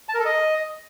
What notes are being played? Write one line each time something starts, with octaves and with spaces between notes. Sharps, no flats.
A5
A#4
A4
D#5